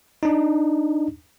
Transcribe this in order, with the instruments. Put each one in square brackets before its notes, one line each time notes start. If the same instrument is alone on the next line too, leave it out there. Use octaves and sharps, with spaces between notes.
[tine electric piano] D4 D#4